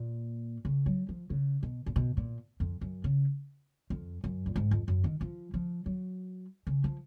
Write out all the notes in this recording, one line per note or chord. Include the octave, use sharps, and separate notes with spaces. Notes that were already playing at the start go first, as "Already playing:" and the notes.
Already playing: A#2
C#3
F#3
F3
C#3
B2
A#2
B2
A#2
F2
F#2
C#3
F2
F#2
A#2
G#2
F2
F#2
D#3
F3
F3
F#3
C#3
F3